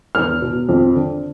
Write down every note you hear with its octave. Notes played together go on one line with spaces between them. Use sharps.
E2 F6
B2
F2
D3